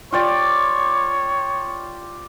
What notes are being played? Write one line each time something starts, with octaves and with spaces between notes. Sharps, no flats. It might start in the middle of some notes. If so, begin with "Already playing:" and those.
F4 G4 C#5 D5